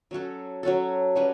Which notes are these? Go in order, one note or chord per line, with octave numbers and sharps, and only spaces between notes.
F#3 C#4 F#4 A4
F#3 C#4 F#4 A4
G3 C#4 F#4 B4